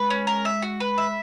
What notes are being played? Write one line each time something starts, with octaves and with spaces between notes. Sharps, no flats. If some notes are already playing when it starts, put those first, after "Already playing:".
Already playing: G#3 B4
C#4
A#4
E5
F#4
B4
E5